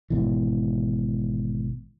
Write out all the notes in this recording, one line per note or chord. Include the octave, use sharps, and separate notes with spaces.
G#1 G#2 B2 E3